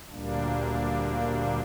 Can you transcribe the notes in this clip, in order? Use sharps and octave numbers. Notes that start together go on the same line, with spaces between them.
D2 A#2 G3 A#3 D4